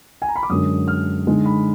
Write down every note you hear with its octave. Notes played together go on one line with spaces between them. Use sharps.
G#5
A#5
B5
D6
F#2 D3 G#3 D#6
F6
D3 G#3 D#4
B5